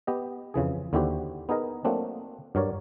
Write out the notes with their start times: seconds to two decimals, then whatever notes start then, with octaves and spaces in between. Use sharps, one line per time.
0.07 B3 G4 D#5
0.54 F2 C#3 E3 G#4
0.93 D#2 D3 E4 F#4 G4 C5
1.49 B3 D#4 G#4 A#4 D#5
1.85 F#3 A3 A#3 C4 D4
2.55 G2 F#3 A#4 C#5 D5